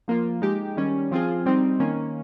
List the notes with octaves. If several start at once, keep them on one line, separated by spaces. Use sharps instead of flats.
F3 A#3 F4
G#3 D#4 G4
D#3 G3 C#4
F3 C4 F4 G#4
G3 C4 D#4
D#3 A#3 C#4